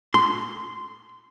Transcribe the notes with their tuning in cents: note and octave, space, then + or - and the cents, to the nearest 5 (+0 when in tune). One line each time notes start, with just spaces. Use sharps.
C6 -15